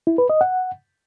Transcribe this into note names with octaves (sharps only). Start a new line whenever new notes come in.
E4
B4
D#5
F#5